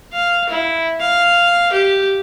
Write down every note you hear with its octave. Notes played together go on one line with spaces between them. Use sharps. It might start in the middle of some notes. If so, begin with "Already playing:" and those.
F5
E4
F5
G4